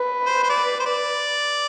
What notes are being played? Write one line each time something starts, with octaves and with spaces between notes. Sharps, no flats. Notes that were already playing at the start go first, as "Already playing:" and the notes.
Already playing: B4
C5
C5
D5
C5
D5